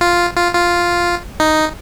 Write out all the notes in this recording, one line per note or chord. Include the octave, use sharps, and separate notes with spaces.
F4
F4
F4
D#4